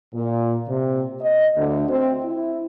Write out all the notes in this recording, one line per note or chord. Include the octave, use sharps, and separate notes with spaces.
A#2
C3
D#5
D2
C4
E4